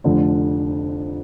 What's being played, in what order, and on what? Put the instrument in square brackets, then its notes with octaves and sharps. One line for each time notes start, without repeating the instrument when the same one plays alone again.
[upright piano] F1 F2 D3